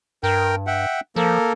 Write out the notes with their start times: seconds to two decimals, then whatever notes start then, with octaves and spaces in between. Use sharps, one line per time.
0.23 G2 A#4 G5
0.67 E5 F#5 G5
1.16 F3 A#3 A4 A#4